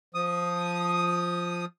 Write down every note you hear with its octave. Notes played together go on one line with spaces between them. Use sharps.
F3 D#6